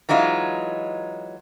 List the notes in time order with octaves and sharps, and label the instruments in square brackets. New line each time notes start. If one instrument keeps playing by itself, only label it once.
[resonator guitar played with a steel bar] E3 F#3 G#3 D#4 F4